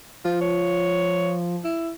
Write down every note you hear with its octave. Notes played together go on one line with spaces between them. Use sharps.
F3 F4
C#5
E4